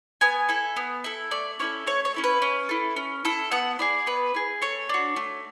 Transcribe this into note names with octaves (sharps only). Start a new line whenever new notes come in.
B3 G#5
E4 A4
B3
E4 A4
A3 D5
C#4 E4 A4 C#5
A3 C#5
C#5
C#4 E4 A4
B4
C#4
E4 A4
C#4
E4 A4
B3 F#5
E4 G#4 D5
B3 B4
E4 G#4
A3 C#5
D4 F#4
A3